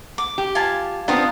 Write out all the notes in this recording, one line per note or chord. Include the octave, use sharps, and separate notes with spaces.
D6
G4
F4 G#5 A5
B3 C4 D4 F4 A#5 D#6